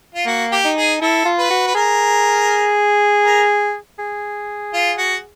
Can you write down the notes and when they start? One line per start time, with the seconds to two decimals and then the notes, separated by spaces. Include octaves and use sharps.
0.15 F4
0.26 A#3 F#4
0.52 G4
0.64 D#4
0.76 G#4
1.01 E4 A4
1.25 F4
1.39 B4
1.50 F#4
1.67 B4
1.75 G#4 A#4
3.24 A#4
3.99 G#4
4.73 F4
4.98 F#4